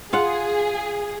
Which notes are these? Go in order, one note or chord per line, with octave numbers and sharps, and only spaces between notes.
F4 G#4 F5 F#5